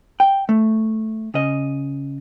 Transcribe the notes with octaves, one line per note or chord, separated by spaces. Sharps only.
G5
A3
C#3 D#5